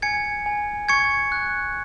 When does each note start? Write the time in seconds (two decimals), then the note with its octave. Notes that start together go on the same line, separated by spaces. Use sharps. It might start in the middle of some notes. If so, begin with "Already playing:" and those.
0.02 G#5 G#6 C#7
0.46 G#5
0.89 C#6 G#6 C#7
1.32 F#6